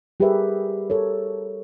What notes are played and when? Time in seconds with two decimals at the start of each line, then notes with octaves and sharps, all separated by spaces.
0.20 G3 G4 G#4 A#4 B4 E5
0.90 A4 A#4 C#5